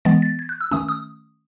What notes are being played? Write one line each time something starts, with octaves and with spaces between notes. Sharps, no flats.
E3 G#3 B3 A6
A6
G#6
F#6
E6
D#3 A3 C#4 D#6
D#6